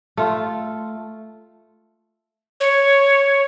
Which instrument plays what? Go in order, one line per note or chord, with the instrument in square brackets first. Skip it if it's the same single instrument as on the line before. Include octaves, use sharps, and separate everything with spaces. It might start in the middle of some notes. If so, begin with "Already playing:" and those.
[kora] A3 F4
[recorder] C#5